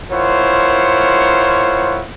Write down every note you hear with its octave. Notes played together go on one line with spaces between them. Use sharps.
E4 F4 A#4 C5 C#5 F#5